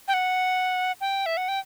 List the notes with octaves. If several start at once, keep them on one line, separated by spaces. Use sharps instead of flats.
G5
F#5
G5
E5
F#5
G5